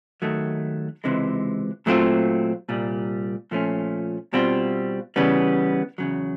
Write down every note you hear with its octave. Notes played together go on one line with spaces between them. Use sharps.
D#2 D#3 F#3 A3
C#2 C3 E3 G#3
A#2 F#3 A3 C4 F4
C2 A#2 G3
A#2 F3 A3 C#4
B2 G3 C4 F4
C#3 E3 G3 B3
E2 C#3 F#3